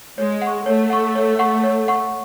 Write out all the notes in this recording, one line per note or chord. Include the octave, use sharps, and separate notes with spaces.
G#3 C#5
F#5
C#6
A3 C#5
F#5 C#6
C#5
F#5 C#6
C#5
F#5 C#6